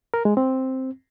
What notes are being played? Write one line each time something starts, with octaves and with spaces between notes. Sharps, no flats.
A#4
G#3
C4